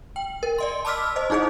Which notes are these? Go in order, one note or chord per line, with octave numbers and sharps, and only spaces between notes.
G5
A#4
D5 D#5 C6
A5 B5 D6 E6 F6 B6
C5 D#5
D#4 E4 G#4 C5 D#5